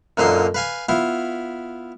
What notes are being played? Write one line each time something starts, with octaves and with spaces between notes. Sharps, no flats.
F#2 A#2 D3 D#4 C5 C6
B4 F5 G#5
B3 E4 F4